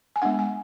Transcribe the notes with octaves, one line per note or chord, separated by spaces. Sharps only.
G#5
G#3 B3 D4 F#5
G#5